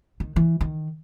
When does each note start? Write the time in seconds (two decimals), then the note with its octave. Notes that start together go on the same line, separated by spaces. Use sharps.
0.20 D#3
0.36 E3
0.61 D#3